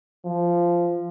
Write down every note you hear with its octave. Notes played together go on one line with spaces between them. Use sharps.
F3